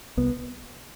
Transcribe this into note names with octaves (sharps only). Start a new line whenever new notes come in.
C2 B3